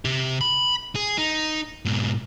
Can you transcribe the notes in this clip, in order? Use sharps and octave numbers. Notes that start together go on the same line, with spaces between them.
C3 G4
B5
G#4
D#4
G#2 B2